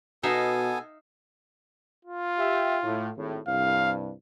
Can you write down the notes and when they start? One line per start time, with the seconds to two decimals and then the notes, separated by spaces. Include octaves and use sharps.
0.23 B2 B3 D#4 A4 E5 F5 G#5
2.05 F4
2.38 G4 E5 G5
2.83 A2
3.17 G#1 A2
3.47 C2 G2 F5